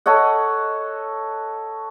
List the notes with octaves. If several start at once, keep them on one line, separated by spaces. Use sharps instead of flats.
A4 C#5 D#5 F#5